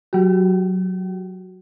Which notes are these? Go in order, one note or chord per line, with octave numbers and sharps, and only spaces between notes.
F#3 F#4